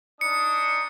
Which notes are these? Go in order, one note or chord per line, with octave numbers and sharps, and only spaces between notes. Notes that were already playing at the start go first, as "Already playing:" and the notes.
D4 D#4 D#6 C#7